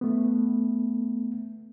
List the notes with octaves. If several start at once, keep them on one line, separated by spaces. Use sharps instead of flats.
A3 B3